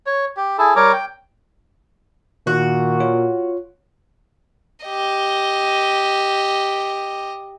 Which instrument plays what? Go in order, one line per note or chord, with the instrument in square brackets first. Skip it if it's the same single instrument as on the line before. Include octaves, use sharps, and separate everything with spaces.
[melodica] C#5
G4
E4 G#4 A4
G3 A#4 C#5 D6
G5
[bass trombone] A#2 [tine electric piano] D#3 [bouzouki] F#4
[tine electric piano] F4 C#5
[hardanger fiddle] G4 D#5